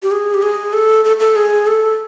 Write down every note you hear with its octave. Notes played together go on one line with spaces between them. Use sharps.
G4
G#4
G4
G#4
A4
A4
A4
G#4
A4